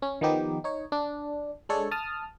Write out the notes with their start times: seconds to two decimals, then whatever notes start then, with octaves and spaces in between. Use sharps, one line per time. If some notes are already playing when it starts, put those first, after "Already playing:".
0.02 C#4
0.21 D#3 F3 B3 D#4 G4
0.64 D#4 C#5
0.92 D4
1.69 G#3 D4 A4 C#5
1.91 A5 D#6 F6